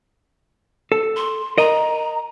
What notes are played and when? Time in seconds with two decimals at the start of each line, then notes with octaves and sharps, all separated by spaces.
0.92 A4
1.16 C6
1.58 A#4 D#5 A#5